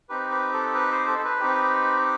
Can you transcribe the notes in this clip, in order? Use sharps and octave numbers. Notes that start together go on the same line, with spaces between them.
C4 D#4 G4 B4
B4
A4
B4
C5
A4
B4
C4 D#4 G4